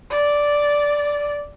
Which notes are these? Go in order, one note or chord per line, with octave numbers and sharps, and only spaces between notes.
D5